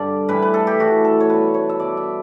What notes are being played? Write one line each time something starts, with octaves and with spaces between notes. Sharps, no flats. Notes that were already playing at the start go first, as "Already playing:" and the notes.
Already playing: G2 D3 G3 D5
A2 E3 G3 B4
B4
A4
G4
A2 E3 G3 F#4
A4
C#5
B2 G3 B4
C#5
E5
B2 G3 D5
E5